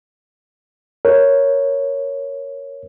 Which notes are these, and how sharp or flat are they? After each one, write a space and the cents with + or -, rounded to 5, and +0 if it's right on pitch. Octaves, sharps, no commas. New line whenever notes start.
A#4 +0 C#5 +0